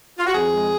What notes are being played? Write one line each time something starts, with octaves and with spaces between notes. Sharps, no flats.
F4
F#4
F2 G#4
G#3